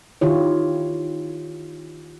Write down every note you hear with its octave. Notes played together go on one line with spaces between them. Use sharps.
D#3 E4 F4 G4 C#5